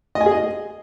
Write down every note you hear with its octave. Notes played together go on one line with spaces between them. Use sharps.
D#5
G#5
G#4
D#5